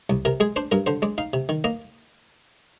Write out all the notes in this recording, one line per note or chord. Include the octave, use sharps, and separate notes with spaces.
C2
C3 A#4
G#3 G#4
D4 C5
G2 A#4
D3 C5
G#3 D5
D#4 F5
C3
D#3
A#3 D#5